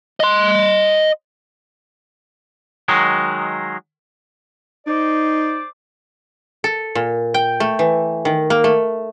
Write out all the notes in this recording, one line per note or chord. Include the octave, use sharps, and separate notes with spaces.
D#5 C6
D#3 F#3 G#3
D#4 C5 D5 D6
A4
A#2
G5
A3
E3
D#3
A#3
A3